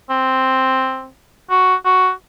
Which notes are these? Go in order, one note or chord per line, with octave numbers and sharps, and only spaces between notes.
C4
F#4
F#4